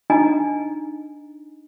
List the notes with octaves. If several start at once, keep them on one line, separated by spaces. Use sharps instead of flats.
D4 D#4 D#5 G#5 A#5